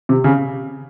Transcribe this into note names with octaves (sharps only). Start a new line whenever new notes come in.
C3
C#3